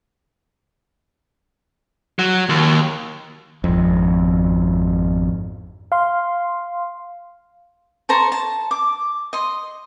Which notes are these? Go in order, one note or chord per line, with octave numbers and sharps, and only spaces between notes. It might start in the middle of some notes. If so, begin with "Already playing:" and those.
F#3
D#2
G#1 F2
F5 C6
A4 C5 A#5 C#6
A5
D6
D#5 C6